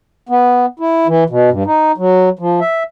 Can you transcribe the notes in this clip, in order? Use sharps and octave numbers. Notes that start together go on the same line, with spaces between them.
B3
E4
E3
B2
G2
D#4
F#3
F3
E5